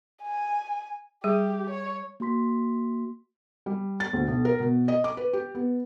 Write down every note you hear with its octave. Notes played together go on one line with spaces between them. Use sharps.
G#5
G3 G4 G#4
C#5
A#3 F#4 C6 B6
G3
A6
D2
B1
A#4
B2
D#5
D6
B4
G4
B3